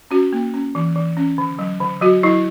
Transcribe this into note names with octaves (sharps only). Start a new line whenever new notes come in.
C#4 F#4
A#3
C#4
E3
E3
C#4
D3
F#3
D3
F#3 F#4
F#3 E4